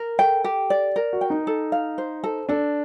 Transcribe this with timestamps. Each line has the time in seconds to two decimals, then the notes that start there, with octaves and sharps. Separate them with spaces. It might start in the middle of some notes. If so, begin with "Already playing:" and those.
Already playing: A#4
0.19 A4 G5
0.44 G4
0.70 D5
0.96 A#4
1.13 F#4
1.21 G5
1.30 D#4
1.47 A4
1.72 F5
1.98 C5
2.24 A4
2.49 D4 A4